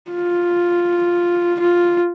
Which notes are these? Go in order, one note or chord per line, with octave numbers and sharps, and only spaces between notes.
F4
F4